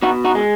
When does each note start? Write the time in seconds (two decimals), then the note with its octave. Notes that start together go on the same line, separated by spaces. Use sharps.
0.02 B2 D#4 F#4
0.25 D#4 F#4
0.35 G#3